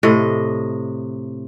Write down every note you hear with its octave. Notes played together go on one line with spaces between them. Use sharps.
A2 C3 D#5